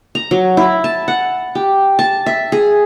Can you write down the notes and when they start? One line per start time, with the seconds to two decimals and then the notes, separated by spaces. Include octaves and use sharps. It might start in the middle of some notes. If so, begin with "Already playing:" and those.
0.15 A#5
0.31 F#3
0.57 E4
0.84 A5
1.08 F#5
1.55 G4
1.99 A5
2.26 E5
2.52 G#4